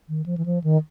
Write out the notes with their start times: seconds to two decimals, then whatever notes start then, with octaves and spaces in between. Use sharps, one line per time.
0.09 D#3
0.26 F3
0.37 E3
0.46 F3
0.64 D#3